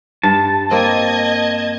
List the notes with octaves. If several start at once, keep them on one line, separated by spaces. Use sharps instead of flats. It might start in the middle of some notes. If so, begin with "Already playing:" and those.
G2 A5
A#3 C4 D#5 G#6